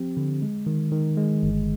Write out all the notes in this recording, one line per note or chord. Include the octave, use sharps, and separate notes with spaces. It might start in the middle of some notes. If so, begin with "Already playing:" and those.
Already playing: F3 C4 G4
D3
G#3
D#3
D#3
G#3
G1